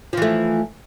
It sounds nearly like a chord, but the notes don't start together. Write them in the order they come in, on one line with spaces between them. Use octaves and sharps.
F3 E3 A3